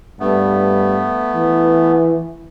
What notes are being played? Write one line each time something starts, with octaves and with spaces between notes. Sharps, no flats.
G2 A3 B3
E3